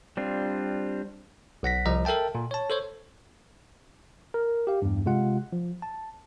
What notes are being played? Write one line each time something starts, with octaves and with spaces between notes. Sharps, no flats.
G3 C4 D4 F4
B1 F#5 A#6 B6
C2 F3 D#5 A#5
A4 A#4 E5 G5 A5
A#2
C#5 A5
A4 C5 C#5
A#4
G4 F5
E2 G2
C3 G#3 F4 F#5
F3
A5